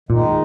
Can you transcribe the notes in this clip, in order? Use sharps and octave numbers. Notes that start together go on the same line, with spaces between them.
A#2 D#3 G#3 D#4